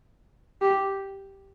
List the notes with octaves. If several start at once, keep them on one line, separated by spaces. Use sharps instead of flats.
G4